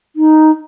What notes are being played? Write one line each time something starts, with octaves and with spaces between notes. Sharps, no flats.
D#4